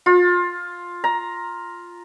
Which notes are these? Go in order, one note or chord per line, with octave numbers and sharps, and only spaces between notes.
F4
A#5